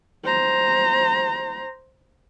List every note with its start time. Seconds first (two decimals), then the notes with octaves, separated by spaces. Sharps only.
0.24 C5 A#5